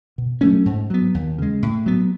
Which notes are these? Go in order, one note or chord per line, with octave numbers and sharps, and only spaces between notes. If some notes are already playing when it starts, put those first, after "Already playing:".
B2
F#3 A3 C#4
G#2
F#3 B3
D#2
C#3 G#3
A2
F#3 B3